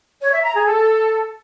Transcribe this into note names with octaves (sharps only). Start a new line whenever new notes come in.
C#5
E5
A#5
G#4
A4